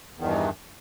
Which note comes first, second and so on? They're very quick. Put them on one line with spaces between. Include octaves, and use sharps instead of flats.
E2 D#3 G2 E3